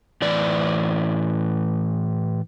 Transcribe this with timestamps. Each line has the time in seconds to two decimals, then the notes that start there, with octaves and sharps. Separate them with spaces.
0.22 A2 E3 D5